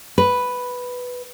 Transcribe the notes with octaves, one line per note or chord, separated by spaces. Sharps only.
B4